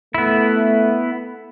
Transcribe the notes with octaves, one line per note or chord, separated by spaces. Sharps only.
A3 B3 E4